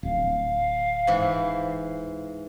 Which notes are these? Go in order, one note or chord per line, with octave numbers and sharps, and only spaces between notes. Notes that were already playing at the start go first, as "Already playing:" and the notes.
D1 F5
G#2 E3